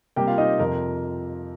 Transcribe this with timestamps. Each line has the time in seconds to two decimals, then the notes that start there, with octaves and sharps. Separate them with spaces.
0.16 C3 G3 A#3 G4 G5
0.27 F4 F5
0.38 D#4 D#5
0.59 F2 C3 F3 A#4